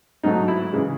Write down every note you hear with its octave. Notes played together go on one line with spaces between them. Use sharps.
G#2 F#3 A3 D#4
E4
C#3 E3 G#3